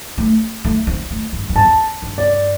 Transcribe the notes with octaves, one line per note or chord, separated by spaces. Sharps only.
A3
A3
C4
A3
G2
G2
E2 A5
G2
D5